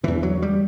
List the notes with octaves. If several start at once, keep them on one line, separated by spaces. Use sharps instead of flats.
E2 D3 E3
F#3
G3